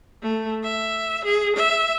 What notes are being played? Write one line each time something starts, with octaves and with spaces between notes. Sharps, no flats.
A3
E5
G#4
E5